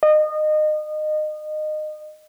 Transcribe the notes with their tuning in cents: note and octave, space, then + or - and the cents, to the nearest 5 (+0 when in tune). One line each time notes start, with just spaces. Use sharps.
D#5 -25